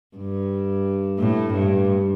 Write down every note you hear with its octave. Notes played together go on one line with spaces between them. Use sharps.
G2
A2
G2